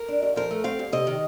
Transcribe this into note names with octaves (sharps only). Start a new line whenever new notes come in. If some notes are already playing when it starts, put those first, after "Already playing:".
Already playing: A#4
D4
D#2
F3 A#4
A3
C4 F5
G2
C3 D#5
D#3